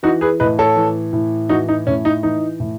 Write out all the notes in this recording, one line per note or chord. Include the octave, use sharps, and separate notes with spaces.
E3 D#4 F#4
G#4 B4
A2 B4 D#5
A4 C#5
E3
A2
E3 D#4 F#4
D#4
A2 C#4
D#4
E3 D#4
A2